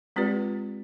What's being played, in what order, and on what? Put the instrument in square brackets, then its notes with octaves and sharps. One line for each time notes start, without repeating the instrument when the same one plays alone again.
[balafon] G#3 C4 F4 G4 B4 D5